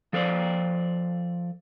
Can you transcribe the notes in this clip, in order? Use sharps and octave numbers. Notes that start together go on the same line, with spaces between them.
F3 A4 C5 D5